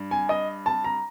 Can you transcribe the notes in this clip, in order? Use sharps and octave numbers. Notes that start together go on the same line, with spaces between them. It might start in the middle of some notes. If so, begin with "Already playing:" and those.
Already playing: G2
G#5
D#5
A5
A#5